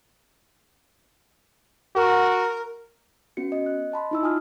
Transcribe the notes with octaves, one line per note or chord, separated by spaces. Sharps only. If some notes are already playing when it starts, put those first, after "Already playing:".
F#4 A#4
B3 C#4 F#4 C#7
D#5
F#6
D#5 A5 B5 C6
D#4 E4 E6
F4 G#5 A5 D#6 F6